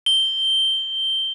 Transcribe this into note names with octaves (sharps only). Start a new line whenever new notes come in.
G7